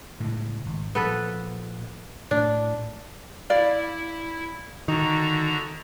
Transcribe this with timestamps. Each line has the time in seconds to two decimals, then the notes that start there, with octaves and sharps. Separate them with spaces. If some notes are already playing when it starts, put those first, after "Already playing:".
0.20 A2 C#3 G#3
0.66 G#1
0.95 A#2 F3 B3 A4 B4
2.31 A2 A3 D4
3.50 E4 D5 F5
4.88 D3 D#3 F#4 A#5